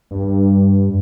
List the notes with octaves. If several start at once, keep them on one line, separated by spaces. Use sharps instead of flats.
G2